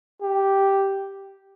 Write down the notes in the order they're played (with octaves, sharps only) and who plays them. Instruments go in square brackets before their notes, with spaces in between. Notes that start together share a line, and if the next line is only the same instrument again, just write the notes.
[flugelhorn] G4